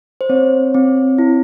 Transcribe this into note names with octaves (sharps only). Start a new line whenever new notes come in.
C5
C4 C#5
C4
E4